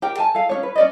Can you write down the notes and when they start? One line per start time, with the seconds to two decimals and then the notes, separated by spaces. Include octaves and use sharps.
0.02 G4 A#4 G5
0.18 G#5 A5
0.35 A4 F5
0.49 C#4 D4 C#5
0.63 B4
0.76 C#4 D5 D#5